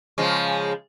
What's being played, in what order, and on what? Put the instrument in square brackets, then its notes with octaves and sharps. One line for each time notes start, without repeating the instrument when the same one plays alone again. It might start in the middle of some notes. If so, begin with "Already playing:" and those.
[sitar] C#3 F3 G#3